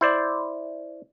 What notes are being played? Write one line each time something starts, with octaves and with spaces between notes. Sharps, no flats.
E4 C5 D5